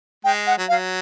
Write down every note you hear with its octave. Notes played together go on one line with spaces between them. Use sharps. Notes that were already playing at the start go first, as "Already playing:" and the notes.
G#3 G5
F#5
F#3
F5
F#3